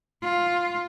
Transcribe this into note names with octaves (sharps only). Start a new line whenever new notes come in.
F4